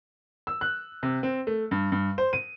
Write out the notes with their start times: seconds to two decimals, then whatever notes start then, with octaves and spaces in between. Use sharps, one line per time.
0.47 E6
0.61 F#6
1.03 C3
1.23 C4
1.47 A3
1.71 G2
1.92 G2
2.18 C5
2.33 D#7